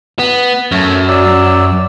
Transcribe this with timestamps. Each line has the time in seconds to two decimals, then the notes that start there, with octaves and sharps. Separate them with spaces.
0.19 B3
0.72 F#2 A3 C#5
1.08 F#3 D5 E6